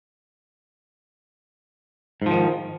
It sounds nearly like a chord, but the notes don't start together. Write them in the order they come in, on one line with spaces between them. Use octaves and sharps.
G#2 F3 D#3